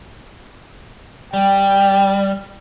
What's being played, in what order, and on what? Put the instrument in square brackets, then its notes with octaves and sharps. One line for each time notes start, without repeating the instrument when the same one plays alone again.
[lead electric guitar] G3 [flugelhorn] G5